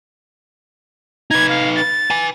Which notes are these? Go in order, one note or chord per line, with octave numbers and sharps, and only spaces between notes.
D#4 B4 G#6
F5
A6
B4 G#5